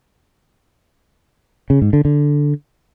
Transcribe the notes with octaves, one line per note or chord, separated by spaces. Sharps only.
C#3
G#2
D3
D3